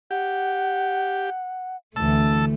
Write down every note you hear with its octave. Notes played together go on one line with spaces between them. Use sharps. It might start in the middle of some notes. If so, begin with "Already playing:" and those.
G4 F#5
D2 D3 E3 A3 A5 E6